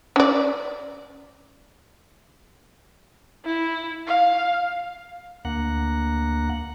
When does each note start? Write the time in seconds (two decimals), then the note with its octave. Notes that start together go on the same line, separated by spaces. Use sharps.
0.16 C#4 D5
3.45 E4
4.07 F5
5.45 D2 A#3 F#5